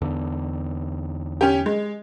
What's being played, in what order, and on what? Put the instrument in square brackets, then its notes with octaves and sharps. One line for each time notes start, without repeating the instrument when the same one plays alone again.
[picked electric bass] E2 D3
[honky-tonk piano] C#4 G4
G#3